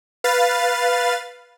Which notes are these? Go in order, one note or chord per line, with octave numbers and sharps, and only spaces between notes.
B4 F5 A6